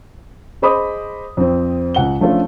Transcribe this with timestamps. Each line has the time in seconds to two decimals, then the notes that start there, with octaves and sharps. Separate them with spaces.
0.62 G#4 C5 D#5 B5 D6 D#6
1.37 F2 C4
1.95 C#2 F#5 G7
2.20 F3 A3 C#4 D4 F4 A4